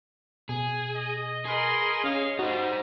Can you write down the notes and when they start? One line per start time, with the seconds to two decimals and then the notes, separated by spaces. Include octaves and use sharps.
0.49 B2 G#4
0.93 D#5
1.45 G#4 A#4 B4 D#5 C6
2.04 C#4 C#5 F5
2.39 G3 D#4 F#4 C5